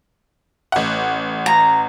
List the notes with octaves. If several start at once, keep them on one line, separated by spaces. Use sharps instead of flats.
A1 F#5
A#5